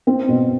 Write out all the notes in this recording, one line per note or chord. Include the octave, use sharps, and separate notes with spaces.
C4
B2